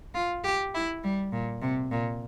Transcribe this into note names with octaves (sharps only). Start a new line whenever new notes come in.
F4
G4
E4
G3
A#2
C3
A#2